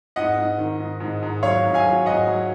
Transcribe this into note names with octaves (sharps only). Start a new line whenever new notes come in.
G#2 D#5 F#5
G#2
D#3
G#2
G#2
G#2
F#3 C#5 F5
G#2
F5 G#5
F#3
G#2 D#5 F#5
F#3